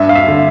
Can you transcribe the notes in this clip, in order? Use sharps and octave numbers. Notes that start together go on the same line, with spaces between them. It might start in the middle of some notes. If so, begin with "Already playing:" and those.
Already playing: G2 E5
F5
E5
D3